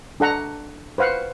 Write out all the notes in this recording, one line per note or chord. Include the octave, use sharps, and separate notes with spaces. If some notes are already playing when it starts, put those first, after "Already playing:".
D4 A4 F#5 A#5
B4 C5 F5 F#5